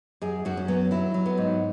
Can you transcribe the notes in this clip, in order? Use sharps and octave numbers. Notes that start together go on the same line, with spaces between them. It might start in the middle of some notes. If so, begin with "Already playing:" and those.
F#2 G#4
F#2 F#4
C#4
F#3 B3
F#3 E4
F#3
B3
G#2